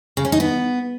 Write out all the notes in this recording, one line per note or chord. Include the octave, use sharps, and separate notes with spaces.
C#3
C#4
D#4
B3